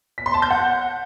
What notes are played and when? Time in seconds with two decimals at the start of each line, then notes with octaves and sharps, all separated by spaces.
0.18 B6
0.26 C6
0.34 A5
0.42 G6
0.50 F#5